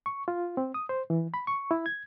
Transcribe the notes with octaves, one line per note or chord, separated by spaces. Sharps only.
C#6
F4
C4
D#6
C5
E3
B5
C#6
E4
G#6